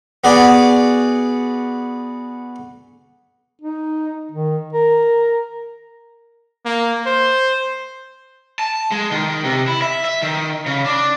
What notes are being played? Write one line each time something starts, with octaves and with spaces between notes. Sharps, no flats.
B3 F#4 G#4 D5
D#4
D#3
A#4
A#3
C5
A5
G#3
D#3
C3
E4
E5
E5
D#3
C#3
D4